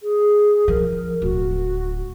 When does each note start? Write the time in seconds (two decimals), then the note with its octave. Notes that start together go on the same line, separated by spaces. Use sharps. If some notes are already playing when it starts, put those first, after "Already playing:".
0.01 G#4
0.68 F3 A#4
1.22 D1 F#4